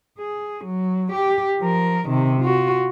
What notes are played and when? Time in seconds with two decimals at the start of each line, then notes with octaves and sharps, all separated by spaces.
0.19 G#4
0.65 F#3
1.12 G4
1.59 F3 A#4
2.08 C3 D#3
2.41 F4 F#4